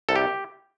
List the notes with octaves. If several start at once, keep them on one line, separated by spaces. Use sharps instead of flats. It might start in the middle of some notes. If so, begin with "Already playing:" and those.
C2 A4
G4